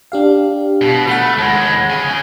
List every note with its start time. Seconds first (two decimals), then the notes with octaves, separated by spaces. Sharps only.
0.12 D4 G4 F5
0.81 B2
1.07 A3 F#5 B5
1.38 D#2 G#3
1.90 C#3 G#5